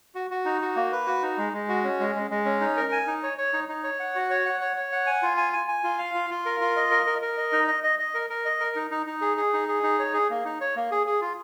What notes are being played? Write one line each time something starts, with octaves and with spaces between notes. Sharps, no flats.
F#4
F#4
D#4
F#4
A#3
B4
F#4
D#4
G#3
G#3
F#4
C#4
G#3
G#3
G#3
C#4
D#4
A#4
G#5
D#4
C#5
C#5
D#4
D#4
C#5
F#5
F#4
C#5
F#5
C#5
C#5
F#5
G#5
F4
G#5
G#5
G#5
F4
F5
F4
F4
A#4
F4
D#5
A#4
A#4
A#4
D#5
D#4
D#5
D#5
D#5
A#4
A#4
D#5
A#4
D#4
D#4
D#4
G#4
G#4
D#4
G#4
D#4
C#5
G#4
A#3
D#4
C#5
A#3
G#4
G#4
F4